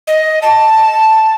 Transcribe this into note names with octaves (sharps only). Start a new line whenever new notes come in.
D#5
A5